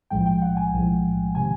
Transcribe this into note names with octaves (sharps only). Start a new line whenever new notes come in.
B1 A2 F3 G#3 G5
G5
F#5
G#5
B1 A2 F3 G#3
C3 D#3 G#5